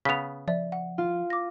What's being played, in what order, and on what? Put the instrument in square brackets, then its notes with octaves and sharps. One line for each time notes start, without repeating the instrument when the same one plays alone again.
[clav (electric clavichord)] C#3 B3 [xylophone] B6 F7
[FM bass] F3 [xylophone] D5 E5
[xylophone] F#5
[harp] F4
[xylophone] D6 A#6